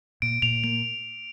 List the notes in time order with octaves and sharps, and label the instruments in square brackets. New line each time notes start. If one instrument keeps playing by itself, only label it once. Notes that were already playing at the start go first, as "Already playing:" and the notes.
[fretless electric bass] A#2 [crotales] D7
[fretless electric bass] A#2 [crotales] F7
[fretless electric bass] A#3 [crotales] F7